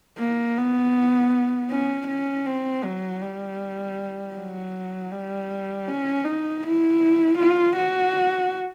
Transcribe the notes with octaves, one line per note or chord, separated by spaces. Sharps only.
A#3
B3
C#4
C#4
C4
F#3
G3
F#3
G3
C#4
D#4
E4
F4
F#4